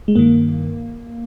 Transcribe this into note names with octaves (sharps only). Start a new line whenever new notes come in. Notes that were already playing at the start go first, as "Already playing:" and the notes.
G#3
G2 D#3 A#3